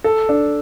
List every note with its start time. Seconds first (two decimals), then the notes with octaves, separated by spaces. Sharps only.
0.04 A4
0.29 D4